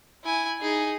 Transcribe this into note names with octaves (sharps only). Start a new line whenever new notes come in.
E4 G#5
D#4 G#4